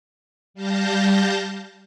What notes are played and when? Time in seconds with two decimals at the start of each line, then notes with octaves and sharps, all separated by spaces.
0.54 G3 F5 A5 G6 A#6